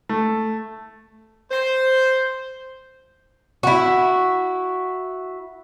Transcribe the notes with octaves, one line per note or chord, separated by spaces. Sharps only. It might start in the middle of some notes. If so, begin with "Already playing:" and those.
A3
C5
E4 F#4